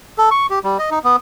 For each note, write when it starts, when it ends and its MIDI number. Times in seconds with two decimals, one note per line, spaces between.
0.18 0.30 69
0.31 0.47 85
0.50 0.59 67
0.64 0.78 55
0.79 0.90 75
0.91 0.99 63
1.04 1.16 59